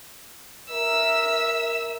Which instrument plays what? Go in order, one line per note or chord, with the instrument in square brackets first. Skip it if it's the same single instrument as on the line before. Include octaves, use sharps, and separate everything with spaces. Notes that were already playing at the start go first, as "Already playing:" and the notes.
[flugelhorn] A#4 [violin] E5 E6